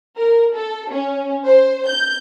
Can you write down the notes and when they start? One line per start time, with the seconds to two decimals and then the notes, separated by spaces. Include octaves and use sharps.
0.17 A#4
0.54 A4
0.90 C#4
1.46 C5
1.87 G6